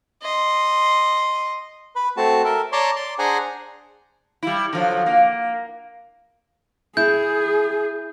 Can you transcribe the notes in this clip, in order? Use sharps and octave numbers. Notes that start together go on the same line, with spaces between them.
D#5 C6
B4 B5
A3 C4 F#4 A5
A4 A#4 E5
C#5 D5 A5 A#5 C6
D5 C6
D4 G#4 C5 F#5 G#5 A#5
G3 E4
D3 F3 F#3
A#3
E4 G#4 G6